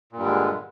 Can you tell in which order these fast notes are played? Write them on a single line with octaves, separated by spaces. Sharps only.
A#2 G2 G3 D3 G#3